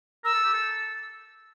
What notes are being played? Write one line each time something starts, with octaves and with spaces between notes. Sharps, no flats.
A#4 E6
A4
G4
A4